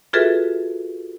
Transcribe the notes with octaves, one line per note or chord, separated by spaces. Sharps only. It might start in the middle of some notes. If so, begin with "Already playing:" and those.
F4 F#4 G#4 A4 B4 E5